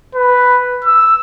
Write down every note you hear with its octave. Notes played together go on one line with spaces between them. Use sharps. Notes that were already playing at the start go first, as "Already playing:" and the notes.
B4
E6